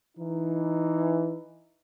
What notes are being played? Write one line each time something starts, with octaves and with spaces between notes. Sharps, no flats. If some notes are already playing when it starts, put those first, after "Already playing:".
E3 D#4